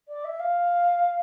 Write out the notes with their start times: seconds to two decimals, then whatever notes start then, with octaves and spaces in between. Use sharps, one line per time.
0.08 D5
0.24 E5
0.39 F5